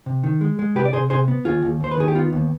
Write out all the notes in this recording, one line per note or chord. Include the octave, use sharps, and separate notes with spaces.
C3
D#3
G#3
G#3
C3 G4 B4
D5
C3 G#4 C5
C3 G#4 C5
B3
D#2 F4 G#4
D#2
D#2 C5
B4
D#3 G#4
G4
B3 F4
D#2